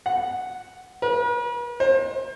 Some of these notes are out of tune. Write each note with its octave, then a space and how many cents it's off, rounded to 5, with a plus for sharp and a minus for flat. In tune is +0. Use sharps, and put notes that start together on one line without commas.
F#5 +0
B4 -45
C5 +35